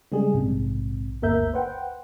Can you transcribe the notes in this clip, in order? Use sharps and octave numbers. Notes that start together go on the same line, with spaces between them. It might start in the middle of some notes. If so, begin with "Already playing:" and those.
C#3 G3 G#3 G#4
A#1 G#2 C3
G1 D2 A#3 A#4 E5 G6
B4 C5 F#5 G5